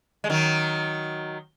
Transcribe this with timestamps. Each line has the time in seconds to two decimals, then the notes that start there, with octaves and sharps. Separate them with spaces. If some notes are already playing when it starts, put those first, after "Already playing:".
0.24 G#3
0.30 D#3 F#3